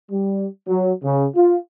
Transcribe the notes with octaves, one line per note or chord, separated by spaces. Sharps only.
G3
F#3
C#3
F4